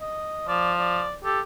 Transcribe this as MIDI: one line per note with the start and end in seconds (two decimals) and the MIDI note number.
0.01 0.45 75
0.48 1.06 53
0.48 0.72 74
0.79 1.14 74
1.25 1.41 67
1.25 1.40 69